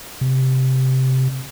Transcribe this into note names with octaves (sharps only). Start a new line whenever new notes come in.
C3